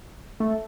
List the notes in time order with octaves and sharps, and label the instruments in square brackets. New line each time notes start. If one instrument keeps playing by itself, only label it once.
[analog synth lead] A3